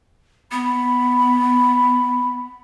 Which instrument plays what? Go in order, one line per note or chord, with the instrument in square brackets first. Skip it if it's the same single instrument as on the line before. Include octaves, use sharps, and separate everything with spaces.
[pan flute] B3 [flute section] B5